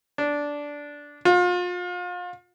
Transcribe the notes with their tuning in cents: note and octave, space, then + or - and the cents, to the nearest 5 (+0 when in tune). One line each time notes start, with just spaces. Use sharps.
D4 -10
F4 +35